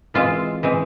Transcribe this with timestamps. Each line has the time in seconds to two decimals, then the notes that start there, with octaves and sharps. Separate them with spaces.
0.14 E3 G#3 C4 F4
0.63 E3 G#3 C4